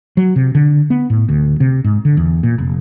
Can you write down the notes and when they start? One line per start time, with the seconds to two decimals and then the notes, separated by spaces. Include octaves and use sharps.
0.17 F#3
0.36 C3
0.55 D3
0.90 B3
1.10 A2
1.29 D2
1.60 C3
1.84 G#2
2.05 D3
2.17 E2
2.43 A#2
2.58 F1